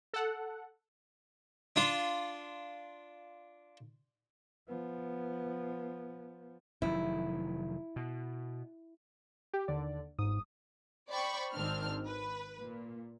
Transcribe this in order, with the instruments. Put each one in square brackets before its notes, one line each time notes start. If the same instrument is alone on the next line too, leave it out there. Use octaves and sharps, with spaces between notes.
[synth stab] A4 F#5
[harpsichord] D4 F4
[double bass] F3 B3
[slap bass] F1 D#3 F#3 [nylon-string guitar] E4
[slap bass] B2
[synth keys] G4
D#2 D3 D5
[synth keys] G1 D#6 [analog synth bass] G#2
[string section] C5 D5 G5 B5 C#6
G#1 D#3 C4 D4 F6
B4
A#2